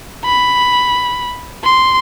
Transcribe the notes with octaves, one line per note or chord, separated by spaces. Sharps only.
B5
C6